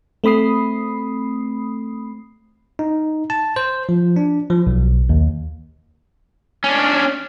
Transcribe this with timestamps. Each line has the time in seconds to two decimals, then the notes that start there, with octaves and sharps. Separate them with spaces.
0.24 A3 C4 B5 D#6 C7
2.79 D#4
3.30 A5
3.56 C5
3.89 F3
4.16 D4
4.50 F3
4.67 B1
5.09 D#2
6.64 C#4 D4